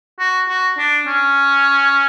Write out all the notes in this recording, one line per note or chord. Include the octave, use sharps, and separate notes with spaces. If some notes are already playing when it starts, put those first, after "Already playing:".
F#4
F#4
D4
C#4